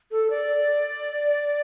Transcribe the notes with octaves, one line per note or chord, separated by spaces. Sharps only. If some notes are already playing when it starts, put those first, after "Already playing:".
A4
D5